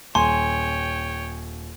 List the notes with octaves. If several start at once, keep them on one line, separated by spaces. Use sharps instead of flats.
D#1 C#5 G5 G#5 C6